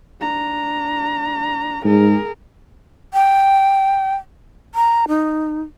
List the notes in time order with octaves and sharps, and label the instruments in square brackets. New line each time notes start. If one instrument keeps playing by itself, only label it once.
[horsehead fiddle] D4 A#5
[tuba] G#2 [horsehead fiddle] G#4 A#4
[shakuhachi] G5
A#5
D#4